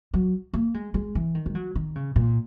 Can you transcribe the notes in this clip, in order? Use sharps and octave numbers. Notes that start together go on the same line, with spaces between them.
F#3
A#3
G#3
G#3
E3
D#3
G#3
F#3
D#3
C#3
A#2